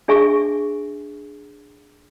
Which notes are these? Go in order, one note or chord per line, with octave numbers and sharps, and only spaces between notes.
D4 G#4 E5 G#5 C#6